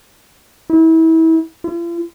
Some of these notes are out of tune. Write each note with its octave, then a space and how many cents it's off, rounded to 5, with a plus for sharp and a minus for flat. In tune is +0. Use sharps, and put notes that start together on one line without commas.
E4 -30
F4 -45